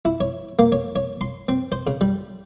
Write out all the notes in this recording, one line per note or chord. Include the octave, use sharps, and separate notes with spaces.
E4
C#5
A#3
C#5
C#5
C6
C4
C5
C#3
G3